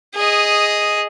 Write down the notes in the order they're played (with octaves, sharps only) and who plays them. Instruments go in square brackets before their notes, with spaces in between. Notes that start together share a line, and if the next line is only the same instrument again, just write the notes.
[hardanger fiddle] G#4 D#5